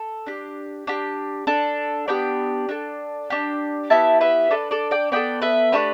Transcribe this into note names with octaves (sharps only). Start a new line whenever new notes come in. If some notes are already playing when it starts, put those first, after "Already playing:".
Already playing: A4
D4 G4
D4 G4
D4 A4
B3 D4 G4 D5 G5
D4 A4
D4 G4
B3 E4 G4 E5 A5
B4 E5
D4 A4 B4
A4 D5
D5 G5
B3 E4 A4 D5 G5
B4 E5
A3 D4 G4 B4